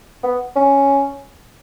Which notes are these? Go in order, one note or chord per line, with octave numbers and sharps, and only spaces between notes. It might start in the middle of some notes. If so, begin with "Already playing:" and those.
B3
C#4